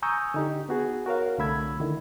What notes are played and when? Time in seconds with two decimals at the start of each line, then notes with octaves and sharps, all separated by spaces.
0.02 G#5 A#5 C#6 D#6 E6 G6
0.34 D3 D#4 G4
0.69 B3 F#4 G#4
1.06 F#4 A#4 C#5 F5
1.38 C2 D3 A3 B5 E6 G#6
1.80 D3 D#3 E4